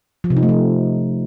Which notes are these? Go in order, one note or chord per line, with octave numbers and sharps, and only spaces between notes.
F3
C3
D#4
A3
F3